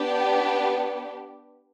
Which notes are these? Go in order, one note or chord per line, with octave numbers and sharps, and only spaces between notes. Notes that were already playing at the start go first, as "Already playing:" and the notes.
Already playing: B3 D4 G4